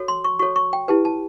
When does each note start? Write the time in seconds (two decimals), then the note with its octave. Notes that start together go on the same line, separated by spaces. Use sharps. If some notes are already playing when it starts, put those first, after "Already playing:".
Already playing: F#4 A4 C#5
0.08 C6
0.24 C#6
0.39 F#4 A4 C#5 C#6
0.56 C#6
0.73 G5
0.88 E4 G4 B4 A5
1.05 A5